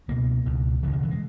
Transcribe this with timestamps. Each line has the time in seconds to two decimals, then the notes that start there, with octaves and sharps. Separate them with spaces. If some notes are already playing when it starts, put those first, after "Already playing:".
0.08 C#2 B2 A#3
0.46 C#2 B2
0.83 E1 D#2 C#3 E3
0.93 D#3
1.03 E3
1.11 G#3